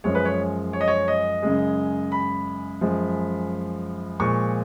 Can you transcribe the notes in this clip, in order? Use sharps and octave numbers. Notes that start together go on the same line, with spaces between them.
F#2 F3 G#3 C#5
B4
C#5
C#5
D#5
C#5
D#5
F#2 C#3 G#3
B5
F#2 F3 G#3
A#2 F3 G#3 C#6